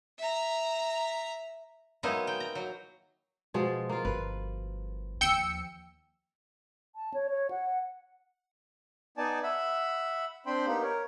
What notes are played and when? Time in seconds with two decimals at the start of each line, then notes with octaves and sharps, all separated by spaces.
0.19 E5 A#5
2.03 F#3 G#3 A#3 B3 D#4 E4
2.27 G5
2.40 A#5
2.55 F#3
3.54 B2 F3 G#3
3.89 A#3 F4
4.05 G1 B4
5.21 D#2 F3 G5 E6 C#7
6.95 A5
7.14 C#5
7.30 C#5
7.50 F#5
9.17 B3 D#4 D5 G#5 A5
9.43 E5 F#5 B5
10.46 C4 D4 C5 G5 B5 C6
10.66 A#3 B3 D#4 G4
10.82 A#4 C#5